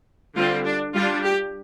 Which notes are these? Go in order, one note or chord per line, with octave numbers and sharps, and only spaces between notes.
D3 G3 C4 F4
D4
G3 D4 F4
G4